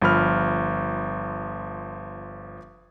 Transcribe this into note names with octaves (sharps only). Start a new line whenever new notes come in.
G1 F3 B5 F6